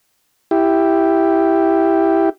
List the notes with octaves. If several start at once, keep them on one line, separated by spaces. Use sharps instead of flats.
E4 G4